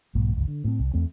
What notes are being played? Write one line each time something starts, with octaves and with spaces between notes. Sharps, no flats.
B1 G#2 A#3
G1 C#2
D3
A2 C4
C2
E2 A3 C4